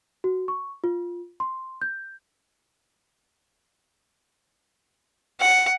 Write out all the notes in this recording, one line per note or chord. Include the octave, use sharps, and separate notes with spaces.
F#4
C#6
F4
C6
G6
F#5